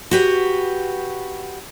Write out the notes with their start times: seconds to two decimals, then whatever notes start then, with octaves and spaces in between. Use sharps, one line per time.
0.11 F#4 G4 B4